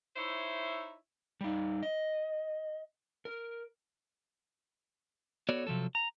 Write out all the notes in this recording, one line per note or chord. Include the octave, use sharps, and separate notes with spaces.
D#4 E4 C5 C#5 E5
G3 D#4
D#5
A#4
B3 F#4 A4 C#5 D5
C3 F3 F#3 A4
A#5